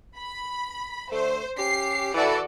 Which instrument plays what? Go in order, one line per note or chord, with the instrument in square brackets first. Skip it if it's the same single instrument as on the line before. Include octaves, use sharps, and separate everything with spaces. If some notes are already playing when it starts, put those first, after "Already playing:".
[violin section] B5
[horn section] D3 A3 [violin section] C5
[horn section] C#4 G4 [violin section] C7
[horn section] E3 [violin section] F#4 A4 D5